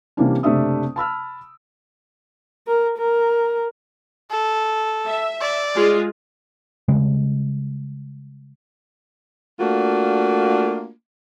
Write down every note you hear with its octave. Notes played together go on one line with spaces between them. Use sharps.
C3 E3 G3 A#3 C#4 D4
F#1 C3 A3 D4 E5 D#6
A5 B5 E6 F6
A#4
A#4
A4
E5
D5
G#3 F4 G#4
C#3 G3 G#3
A3 A#3 D4 F4 F#4